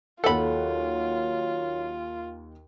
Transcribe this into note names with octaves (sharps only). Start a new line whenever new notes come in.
D#2 F#3 F4 A4 F#5 B5